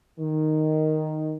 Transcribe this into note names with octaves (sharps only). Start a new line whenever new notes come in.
D#3